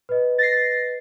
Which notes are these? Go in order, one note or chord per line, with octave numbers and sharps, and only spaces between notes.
B4 D#5
A6 A#6 C7